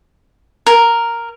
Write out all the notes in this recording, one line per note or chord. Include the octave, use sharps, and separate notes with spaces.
A#4